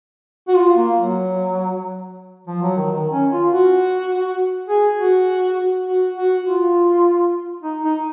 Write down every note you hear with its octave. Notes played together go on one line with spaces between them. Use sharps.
F#4
F4
A#3
F#3
F3
F#3
D#3
D#3
C#4
F4
F#4
G#4
F#4
F#4
F#4
F4
D#4
D#4